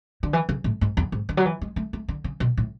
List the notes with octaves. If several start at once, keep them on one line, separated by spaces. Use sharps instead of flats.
D3
E3
C#3
A2
G#2
E2
G#2
D3
F#3
E3
G#3
A3
A3
D3
C#3
B2
A2